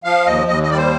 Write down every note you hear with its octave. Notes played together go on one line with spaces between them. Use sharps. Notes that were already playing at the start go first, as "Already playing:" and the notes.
F3 F5
D#2 D#5
D#2 D#5
D#5
G3 D5
C5